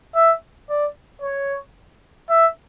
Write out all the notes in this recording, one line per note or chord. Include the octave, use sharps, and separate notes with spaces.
E5
D5
C#5
E5